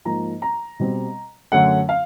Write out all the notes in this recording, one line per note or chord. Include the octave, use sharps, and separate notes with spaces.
G#2 F3 A#3 A#5
A#5
B2 G3 C4
F#2 D3 F#3 A3 C#4 F#5
F5